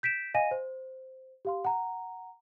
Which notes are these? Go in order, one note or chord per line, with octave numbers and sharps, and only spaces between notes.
G6 B6 D7 E7
D#5 F5 G#5 A#6 D#7
C5
G4 F5 C6
F#5 A#5